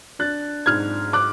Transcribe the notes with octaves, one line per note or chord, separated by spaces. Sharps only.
D4 F#6 A6
G#2 F6 G#6
D6 F#6